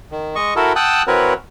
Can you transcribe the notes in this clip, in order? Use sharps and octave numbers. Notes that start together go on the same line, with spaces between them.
D#3
G#3 D#5 C#6
E4 F#4 A4 A#4
F#5 G5 A5 D#6 E6 F#6
E3 C4 F#4 A#4 B4 C#5